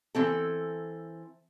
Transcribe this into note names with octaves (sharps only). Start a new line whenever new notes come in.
E3 C4 A4